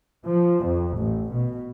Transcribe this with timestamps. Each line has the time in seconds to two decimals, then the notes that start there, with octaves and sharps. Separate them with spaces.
0.24 F3
0.64 F2
0.96 A1
1.31 B2